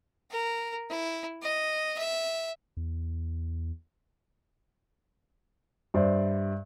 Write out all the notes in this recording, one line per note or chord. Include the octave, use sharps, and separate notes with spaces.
A#4
E4
D#5
E5
E2
G2 C5 D5 E5